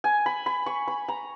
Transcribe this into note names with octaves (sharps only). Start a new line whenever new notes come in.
G#5
B5
B5
C#6
B5
A#5